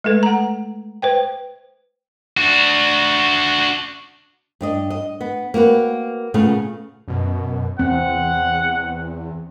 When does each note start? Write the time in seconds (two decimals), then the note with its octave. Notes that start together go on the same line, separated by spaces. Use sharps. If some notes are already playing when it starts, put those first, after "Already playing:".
0.04 G#3 A3 A4 B4
0.23 F#5 A#5
1.02 B4 C5 G5
2.37 D4 F#4
4.61 G2 D4 D#5
4.90 D#5
5.21 B3
5.54 A#3 C4 F#4 B4
6.34 A#2 C#3 A3 B3 G#4 F5
7.08 F#2 B2
7.79 E2 C4 F#5